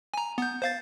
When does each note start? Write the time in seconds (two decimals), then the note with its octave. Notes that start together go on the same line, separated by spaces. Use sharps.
0.14 G#5 A#5
0.38 B3 G6
0.62 C5 F5 A6